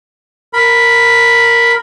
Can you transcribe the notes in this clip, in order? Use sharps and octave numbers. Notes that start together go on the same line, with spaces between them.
A#4 B5